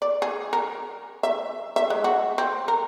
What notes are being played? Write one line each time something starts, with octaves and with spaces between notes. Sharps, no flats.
D5
G#4
A#4
E5
E5
G#3
F#4
C4
A#4